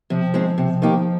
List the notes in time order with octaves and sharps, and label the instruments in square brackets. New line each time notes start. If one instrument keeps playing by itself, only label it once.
[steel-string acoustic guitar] C3 [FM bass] F3
[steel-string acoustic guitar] D#3 G#3 C4 D#4
C3
D#3 A#3 D#4 G4